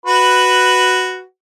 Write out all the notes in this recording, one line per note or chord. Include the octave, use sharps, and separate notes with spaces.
F#4 B4